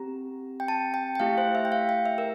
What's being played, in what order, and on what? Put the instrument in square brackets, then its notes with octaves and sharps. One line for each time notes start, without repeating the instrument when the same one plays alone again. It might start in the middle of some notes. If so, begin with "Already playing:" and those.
Already playing: [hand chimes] C4 G4 A#5
G5
A5
G5
G5
A3 E4 G4 F5
C5
E5
G5
F5
G5
E5
A#4